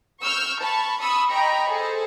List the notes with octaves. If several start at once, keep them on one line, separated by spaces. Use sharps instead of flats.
C#6 E6 F6 G6
A5 B5 C#6
B5 C#6 D#6 E6
D#5 G5 A#5 B5 C#6
G#4 A4 C5